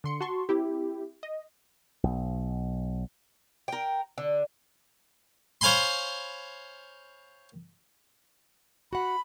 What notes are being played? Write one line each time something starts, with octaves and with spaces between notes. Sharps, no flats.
D3 C6 C#7
F#4 A5 C6 C#6
C4 E4 G4
D#5
B1
A#4 G5
D3
C5 C#5 F5 G#5 B5 C6
F#4 F#5 B5